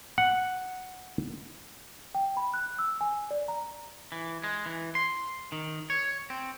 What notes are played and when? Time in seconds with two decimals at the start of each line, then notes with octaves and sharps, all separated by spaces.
0.18 F#5
2.15 G5
2.37 B5
2.54 F#6
2.79 E6
3.01 G#5
3.31 D5
3.48 A#5
4.12 E3
4.44 G#3
4.66 E3
4.95 C6
5.52 D#3
5.90 C#5
6.30 C4